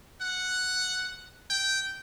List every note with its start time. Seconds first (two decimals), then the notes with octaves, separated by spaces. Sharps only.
0.21 F#5
1.50 G5